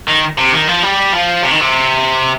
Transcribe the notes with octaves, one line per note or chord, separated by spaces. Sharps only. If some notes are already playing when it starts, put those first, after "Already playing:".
D#3
C3
D#3
F3
G3
F3
C3
D#3
C3